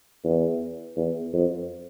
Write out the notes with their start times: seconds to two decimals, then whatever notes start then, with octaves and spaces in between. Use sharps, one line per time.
0.24 E2
0.97 E2
1.34 F2